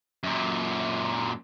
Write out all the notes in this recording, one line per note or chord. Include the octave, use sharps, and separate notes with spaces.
F#2 A#2